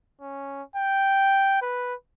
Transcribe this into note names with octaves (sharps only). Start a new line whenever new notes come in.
C#4
G5
B4